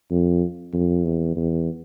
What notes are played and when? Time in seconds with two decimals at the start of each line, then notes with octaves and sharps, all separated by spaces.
0.11 F2
0.73 F2
1.05 E2
1.36 E2